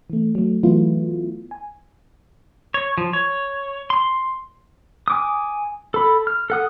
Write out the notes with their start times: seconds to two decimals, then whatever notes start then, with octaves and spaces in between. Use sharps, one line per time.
0.10 E3 A3
0.35 F#3 A3
0.63 E3 F#3 A3 B3 E4 F4
1.51 G#5
2.74 C#5
2.98 F3
3.13 C#5
3.90 C6
5.08 G#5 D6 D#6
5.94 A4 B5
6.27 F6
6.50 A4 F#5 D#6